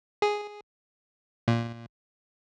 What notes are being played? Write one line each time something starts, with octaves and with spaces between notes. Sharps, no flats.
G#4
A#2